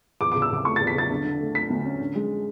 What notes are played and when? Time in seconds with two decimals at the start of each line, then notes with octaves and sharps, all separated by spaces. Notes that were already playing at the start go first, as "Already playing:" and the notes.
0.21 E2 D6
0.32 C#3 D6
0.42 E6
0.51 C#3 D6
0.65 A3 C#6
0.76 E2 A6
0.87 B6
0.95 C#3 A6
1.09 D3
1.25 D3
1.40 A3
1.55 A3 B6
1.70 D2
1.85 C#4
2.00 D3
2.15 G#3